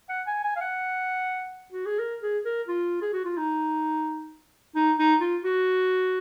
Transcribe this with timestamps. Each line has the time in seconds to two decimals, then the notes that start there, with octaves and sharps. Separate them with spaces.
0.09 F#5
0.27 G#5
0.44 G#5
0.56 F5
0.61 F#5
1.72 F#4
1.86 G#4
1.99 A#4
2.23 G#4
2.46 A#4
2.68 F4
3.02 G#4
3.13 F#4
3.25 F4
3.37 D#4
4.76 D#4
4.99 D#4
5.21 F4
5.44 F#4